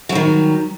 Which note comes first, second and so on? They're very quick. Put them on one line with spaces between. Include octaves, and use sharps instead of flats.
F#3 G3 D#3